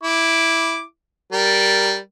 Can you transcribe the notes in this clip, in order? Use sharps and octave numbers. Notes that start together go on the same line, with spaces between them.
E4 D6
G3 A#4